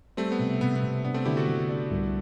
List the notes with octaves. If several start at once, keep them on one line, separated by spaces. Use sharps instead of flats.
G3 A3 C4
B3
C3
C3 B3
B3
C3
B3 D4
A3 C4
D3 E4 G4
F#4 A4
D3
D4
C2